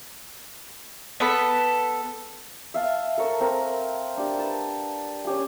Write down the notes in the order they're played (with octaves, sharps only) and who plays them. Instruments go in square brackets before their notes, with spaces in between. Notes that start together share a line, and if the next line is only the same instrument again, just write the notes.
[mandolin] B3 A4 B5
[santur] E5 F5 A5
A4 A#4 C#5
C4 A#4
D4 G4
B4 D5 A5
C#4 G4 G#5